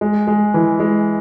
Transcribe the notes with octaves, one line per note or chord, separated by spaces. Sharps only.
G#3
G#3
E3
G#3